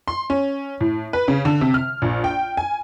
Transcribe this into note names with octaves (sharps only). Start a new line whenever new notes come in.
C6
C#4
A2
B4
C#3
D3
C3
F6
A#1
G5
G#5